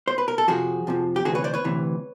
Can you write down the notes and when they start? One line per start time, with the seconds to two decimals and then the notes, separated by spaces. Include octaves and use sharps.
0.08 C5
0.18 B4
0.28 A#4
0.38 A4
0.48 F2 C3 F3 F#4 G#4
0.87 F2 C3 F3
1.16 G4
1.25 D2 C3 E3 F#4 G#4
1.35 B4 C#5
1.44 C5 D5
1.54 B4 C#5
1.64 D2 C3 E3